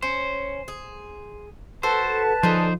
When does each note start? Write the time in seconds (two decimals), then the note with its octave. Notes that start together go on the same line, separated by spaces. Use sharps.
0.02 C#4 C5
0.68 G#4
1.83 F#4 A4 B4 C5 A5
2.43 D3 F3 D#4 G#4 C5